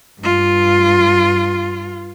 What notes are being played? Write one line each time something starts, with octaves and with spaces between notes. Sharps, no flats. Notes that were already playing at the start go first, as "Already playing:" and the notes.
G2 F4